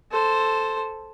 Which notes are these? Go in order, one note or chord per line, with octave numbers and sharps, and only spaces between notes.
A4 C5